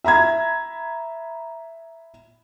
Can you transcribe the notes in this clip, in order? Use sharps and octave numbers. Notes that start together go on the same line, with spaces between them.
E5 A#5 B5 G#6